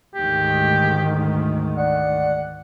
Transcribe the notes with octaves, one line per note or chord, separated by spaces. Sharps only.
D2 G#2 D#3 G4
D5 F#5